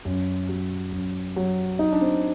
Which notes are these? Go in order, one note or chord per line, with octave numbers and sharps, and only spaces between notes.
F#2
F#3
F#2
F#3
F#3 D#4
D4
C4